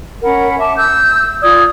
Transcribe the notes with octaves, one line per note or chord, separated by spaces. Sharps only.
C#4 A#4 F#5 B5
E5 A5 D6
E6 G6
F4 D5 D#6 G#6